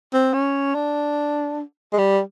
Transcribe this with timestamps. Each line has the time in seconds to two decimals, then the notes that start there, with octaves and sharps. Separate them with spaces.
0.14 C4
0.34 C#4
0.75 D4
1.93 G#3
1.98 G3